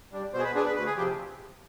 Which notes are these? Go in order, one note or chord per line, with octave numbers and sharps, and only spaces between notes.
G3 D4
B2 C5
G#4
B4
B3 D4 G#4
B4
D2 B4
G#4
C3 F3 G4